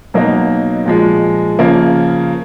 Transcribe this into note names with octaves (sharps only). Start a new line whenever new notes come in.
B2 F#3 A#3 D#4
A#2 F3 G#3
C#3 F3 A#3